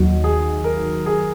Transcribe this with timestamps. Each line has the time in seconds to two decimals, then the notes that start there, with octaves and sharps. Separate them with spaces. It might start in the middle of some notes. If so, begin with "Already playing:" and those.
Already playing: D#2 D#3 F#3 D#4 F#4
0.24 G#4
0.64 A#4
1.06 G#4